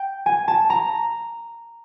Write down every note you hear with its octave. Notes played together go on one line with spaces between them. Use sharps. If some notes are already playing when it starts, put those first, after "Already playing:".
Already playing: G5
G#5
A5
A#5